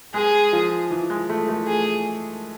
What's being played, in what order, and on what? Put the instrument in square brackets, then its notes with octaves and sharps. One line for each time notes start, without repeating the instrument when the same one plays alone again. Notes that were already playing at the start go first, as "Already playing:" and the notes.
[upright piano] G#3 [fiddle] G#4
[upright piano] F3
E3
G#3
A3
A3
[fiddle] G#4